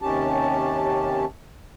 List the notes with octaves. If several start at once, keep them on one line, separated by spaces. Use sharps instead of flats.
D#2 C3 D#3 C#4 G4 A5